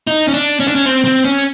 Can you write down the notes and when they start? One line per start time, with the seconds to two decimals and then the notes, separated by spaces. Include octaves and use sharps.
0.07 D#4
0.28 C#4
0.34 D4
0.60 C#4
0.67 D4
0.75 C#4
0.86 C4
1.04 C4
1.24 C#4